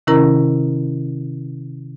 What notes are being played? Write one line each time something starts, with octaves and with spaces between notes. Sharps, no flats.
C3 D#3 C#4 E4 A#4 A#5